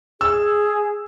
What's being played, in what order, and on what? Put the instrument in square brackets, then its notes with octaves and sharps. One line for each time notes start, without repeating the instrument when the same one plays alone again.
[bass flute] G#4 [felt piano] E6